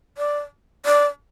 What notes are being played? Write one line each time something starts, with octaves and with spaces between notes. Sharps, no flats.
D5
D5